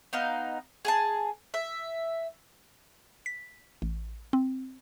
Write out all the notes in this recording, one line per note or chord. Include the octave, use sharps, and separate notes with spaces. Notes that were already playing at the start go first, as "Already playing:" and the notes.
B3 D#4 F5
G#4 G#5 A5
E5
B6
A1
C4